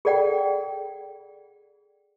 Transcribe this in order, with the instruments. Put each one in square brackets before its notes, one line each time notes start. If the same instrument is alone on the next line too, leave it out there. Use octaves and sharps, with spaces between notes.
[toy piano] G#4 A4 D5 F#5 G5